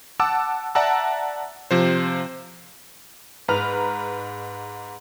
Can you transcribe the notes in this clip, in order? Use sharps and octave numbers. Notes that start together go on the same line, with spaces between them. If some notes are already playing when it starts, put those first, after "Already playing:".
F#5 A5 D6 E6
D5 E5 F#5 A5 A#5 E6
C3 F3 C5
G#2 B4 A#5 F6